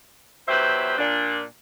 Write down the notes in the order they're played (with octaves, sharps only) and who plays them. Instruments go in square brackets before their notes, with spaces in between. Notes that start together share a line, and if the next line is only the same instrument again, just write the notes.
[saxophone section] E2 F#3 G4 B4 C5 E5
A#2 D4